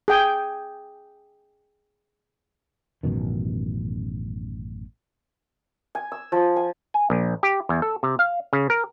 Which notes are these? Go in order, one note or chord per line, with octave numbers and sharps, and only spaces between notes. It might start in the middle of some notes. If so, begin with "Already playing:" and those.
G#4 G5
A1 F#2 B2 D#3
G#5
E6
F3
G#5
G#5
A#1
G4
E2
A4
C3
F5
C#3
A#4